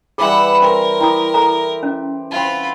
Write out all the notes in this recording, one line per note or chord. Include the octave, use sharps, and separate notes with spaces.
E3 G3 G#4 B4 F#5 C#6 E6
C4 A#4
E4 G4 G5 D#6
A4 A#5
C#4
C4 F4 F#5 A5 B5